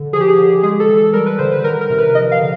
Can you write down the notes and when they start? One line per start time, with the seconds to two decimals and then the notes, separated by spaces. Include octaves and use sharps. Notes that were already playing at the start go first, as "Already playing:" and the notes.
Already playing: D3
0.13 F3 G#4
0.20 G4
0.28 G#4
0.38 D3
0.63 G#3 G#4
0.80 A4
0.89 E3
0.97 A4
1.13 G3 A#4
1.26 B4
1.38 D3 C5
1.52 B4
1.64 D#3 A#4
1.81 A#4
1.90 C3
1.98 B4
2.15 F3 D#5
2.32 F5
2.40 D3